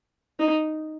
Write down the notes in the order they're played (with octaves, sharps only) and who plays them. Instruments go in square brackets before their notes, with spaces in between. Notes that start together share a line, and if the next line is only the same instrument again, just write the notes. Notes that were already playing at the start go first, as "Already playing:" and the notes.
[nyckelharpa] D#4